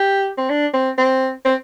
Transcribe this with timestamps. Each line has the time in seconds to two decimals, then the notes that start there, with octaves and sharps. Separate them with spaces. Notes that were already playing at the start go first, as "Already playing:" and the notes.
Already playing: G4
0.38 C4
0.50 D4
0.74 C4
0.98 C4
1.45 C4